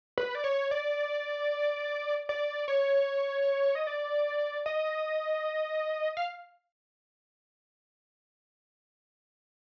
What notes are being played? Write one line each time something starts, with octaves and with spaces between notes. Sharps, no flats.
B4
D5
C#5
D5
D5
C#5
D#5
D5
D#5
F5